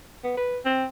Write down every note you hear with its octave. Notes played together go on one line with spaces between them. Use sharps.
B3
B4
C4